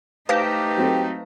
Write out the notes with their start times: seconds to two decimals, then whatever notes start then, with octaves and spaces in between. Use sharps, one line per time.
0.29 A3 D#4 G4 B4 C5 F5
0.77 F#3 C4 A4